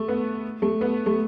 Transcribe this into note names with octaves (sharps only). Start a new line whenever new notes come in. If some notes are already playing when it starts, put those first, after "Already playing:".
Already playing: A3
B3
A3
B3
A3